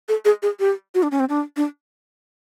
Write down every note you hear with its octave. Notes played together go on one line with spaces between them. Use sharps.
A4
G#4
G#4
G4
F#4
D4
C#4
C4
D4
D4